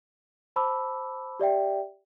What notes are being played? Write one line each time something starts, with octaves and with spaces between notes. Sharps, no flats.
C5 A5 B5 D6 E6
G4 D5 E5 G5